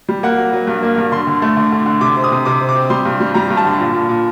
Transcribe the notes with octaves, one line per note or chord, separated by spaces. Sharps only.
G3
A#3 F#5
F#3
F#3
G2
A#3
G2
D3 C6
D3
A3
D3
D3
D3
C3 D6
C4
D#6
C3
C3 D6
C4
D6
C4
G3 C6
G2
G3
G3 A#5
G2
A5
D3
A#2
A#2
A#2